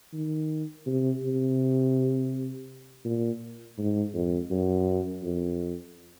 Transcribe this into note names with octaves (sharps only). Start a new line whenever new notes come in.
D#3
C3
C3
A#2
G#2
F2
F#2
F2